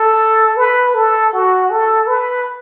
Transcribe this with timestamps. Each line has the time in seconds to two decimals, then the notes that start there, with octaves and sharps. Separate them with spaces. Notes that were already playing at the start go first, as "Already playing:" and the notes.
Already playing: A4
0.57 B4
0.95 A4
1.33 F#4
1.70 A4
2.07 B4